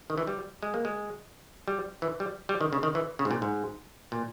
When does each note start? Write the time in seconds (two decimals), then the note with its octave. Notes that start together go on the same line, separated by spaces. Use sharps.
0.10 D#3
0.18 E3
0.27 G3
0.63 G#3
0.74 A#3
0.85 G#3
1.68 G3
2.02 E3
2.20 G3
2.49 G3
2.61 D#3
2.73 C#3
2.83 D#3
2.95 E3
3.19 C#3
3.25 G#2
3.31 A#2
3.42 G#2
4.12 A#2